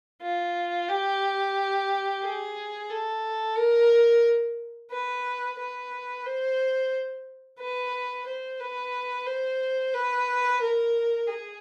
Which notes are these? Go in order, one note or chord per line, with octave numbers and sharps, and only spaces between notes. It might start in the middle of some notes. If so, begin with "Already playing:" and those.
F4
G4
G#4
A4
A#4
B4
B4
C5
B4
C5
B4
C5
B4
A#4
G#4